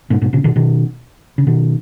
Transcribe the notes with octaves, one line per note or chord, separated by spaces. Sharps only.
G#2 B2
G#2 B2
A#2 C#3
B2 D#3
B2 D#3
C#3
B2 D#3